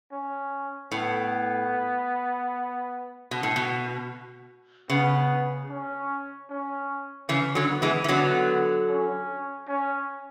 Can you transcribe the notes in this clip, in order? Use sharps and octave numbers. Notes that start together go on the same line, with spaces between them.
C#4
A2 B3
B2
A2
B2
C#3 B3
C#4
C#4
C#3 E3 C#4
D3 F#3
B3
E3 G#3
E3
D3 F#3 B3
C#4
C#4